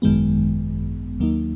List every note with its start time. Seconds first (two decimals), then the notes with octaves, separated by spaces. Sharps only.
0.02 G#1 F#2 D#3 G#3 B3
1.20 D#2 D#3 F#3 A#3 D#4